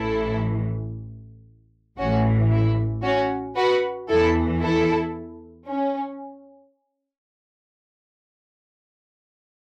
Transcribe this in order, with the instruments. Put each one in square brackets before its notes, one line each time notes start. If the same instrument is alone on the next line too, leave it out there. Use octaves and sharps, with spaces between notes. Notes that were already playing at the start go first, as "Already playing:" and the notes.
Already playing: [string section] A1 A2 E3 E4 A4
A1 A2 E3 C#4 F#4
E4
C#4 F#4
F#4 B4
E2 E3 E4 A4
E4 A4
C#4